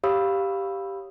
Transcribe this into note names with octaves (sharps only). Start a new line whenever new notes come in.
G4 C#5 F5 B5 D#6 E6